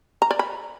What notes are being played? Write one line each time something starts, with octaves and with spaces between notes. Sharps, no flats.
A#5
D5
B5